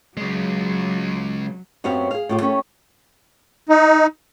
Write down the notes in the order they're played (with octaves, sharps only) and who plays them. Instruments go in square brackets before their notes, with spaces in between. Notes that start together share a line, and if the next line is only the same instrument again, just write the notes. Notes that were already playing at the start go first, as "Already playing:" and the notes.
[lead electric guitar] C#3 G#3 [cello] F#3
[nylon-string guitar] F#2 F#3 B3 C4 G4 F5
G#4 F5
A2 F4 G4
A3 C#4 G4 A4
[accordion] D#4